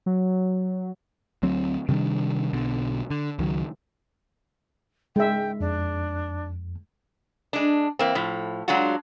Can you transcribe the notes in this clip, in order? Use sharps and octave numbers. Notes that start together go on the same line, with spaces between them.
F#3
D2 F#3 C4
C3 D#3 G3 D4
B1 B2 D3
D3
C#2 D#3 F#3
G#3 E5 G5
F2 D4
G#3 D4
E3 A#3 C4
A2 F3
F#3 G#3 D4 F4 F#4